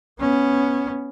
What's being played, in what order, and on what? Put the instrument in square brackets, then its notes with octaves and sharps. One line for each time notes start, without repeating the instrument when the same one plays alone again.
[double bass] B3 C#4